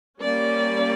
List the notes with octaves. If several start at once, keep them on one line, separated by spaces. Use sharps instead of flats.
G3 A#3 C#4 D5